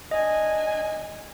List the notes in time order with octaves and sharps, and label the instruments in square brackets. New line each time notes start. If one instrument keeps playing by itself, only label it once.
[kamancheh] D4 G#5 [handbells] D#5